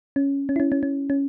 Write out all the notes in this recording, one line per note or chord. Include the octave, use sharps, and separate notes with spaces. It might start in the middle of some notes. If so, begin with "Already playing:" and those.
C#4
C#4
E4
C#4
C#4
C#4
C#4